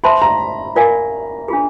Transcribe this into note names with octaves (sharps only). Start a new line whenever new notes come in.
C5 E5 A5 B5 C6
A#5
F4 A#4 D5 F5 G#5
D4 F4 G#4